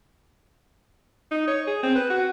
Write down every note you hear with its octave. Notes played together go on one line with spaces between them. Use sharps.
D#4
C#5
G#4
C4
B4
F#4